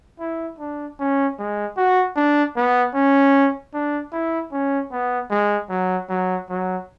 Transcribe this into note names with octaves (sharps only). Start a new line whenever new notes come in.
E4
D4
C#4
G#3
F#4
D4
B3
C#4
D4
E4
C#4
B3
G#3
F#3
F#3
F#3